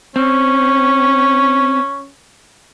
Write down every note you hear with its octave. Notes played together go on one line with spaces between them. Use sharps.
C4 C#4